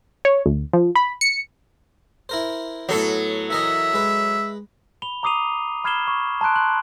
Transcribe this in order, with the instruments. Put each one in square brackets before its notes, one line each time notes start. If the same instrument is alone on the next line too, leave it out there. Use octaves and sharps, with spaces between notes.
[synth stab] C#5
D2
F3
B5
C#7
[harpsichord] E4 A#4 C5
[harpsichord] A2 B3 [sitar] F#3 A4
[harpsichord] E3 A#4 D#5 [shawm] E5
[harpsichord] G#3 B4
[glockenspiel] B5 F7 G7
A#5 D6 D#6 C7 D#7 F7
B5 F6 G#6 C7 E7 G7
C#6
A5 A#5 C6 F#6 D7
C6 F#6 F#7